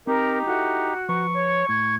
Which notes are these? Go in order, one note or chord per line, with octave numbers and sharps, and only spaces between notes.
C4 D#4 G4 A#4
E4 F#4 A4 E5
F3 B4 A#5 C#6
C#5
A2 G#6